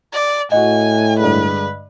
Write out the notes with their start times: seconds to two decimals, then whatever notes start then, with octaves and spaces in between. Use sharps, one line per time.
0.13 D5
0.52 A2 F#4 D#5 F#5 G#5
1.19 G2 D3 G#3 B4